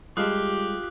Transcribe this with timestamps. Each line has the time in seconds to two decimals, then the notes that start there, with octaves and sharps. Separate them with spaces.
0.17 G3 G#3 F4 G4 A4 D#6 F#6